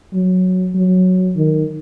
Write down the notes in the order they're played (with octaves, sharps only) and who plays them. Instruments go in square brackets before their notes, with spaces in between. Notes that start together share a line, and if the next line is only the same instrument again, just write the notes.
[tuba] F#3
F#3
D#3